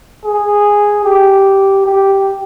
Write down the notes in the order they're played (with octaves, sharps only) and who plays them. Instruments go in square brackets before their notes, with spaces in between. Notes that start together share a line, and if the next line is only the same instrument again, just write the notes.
[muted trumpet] G#4
G4
G4